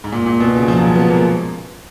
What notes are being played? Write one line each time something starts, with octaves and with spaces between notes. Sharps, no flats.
G#2
A#2
A#2
B2
C#3
F3
F#3
G#3
B3
A#3